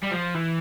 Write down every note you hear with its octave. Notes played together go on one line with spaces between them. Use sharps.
G3
F3
E3